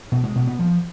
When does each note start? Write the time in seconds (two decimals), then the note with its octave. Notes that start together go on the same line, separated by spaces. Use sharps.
0.12 B2
0.24 G#3
0.36 B2
0.47 B3
0.59 F3